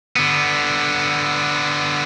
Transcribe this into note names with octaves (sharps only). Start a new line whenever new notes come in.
D3 B3